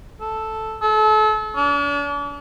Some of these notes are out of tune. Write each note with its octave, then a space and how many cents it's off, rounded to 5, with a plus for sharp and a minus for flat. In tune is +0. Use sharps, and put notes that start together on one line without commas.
A4 +0
A4 -35
D4 -40